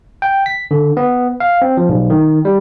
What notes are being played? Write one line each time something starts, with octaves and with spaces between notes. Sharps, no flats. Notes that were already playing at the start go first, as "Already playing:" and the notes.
G5
B6
D3
B3
F5
C4
F3
B1
D#3
G3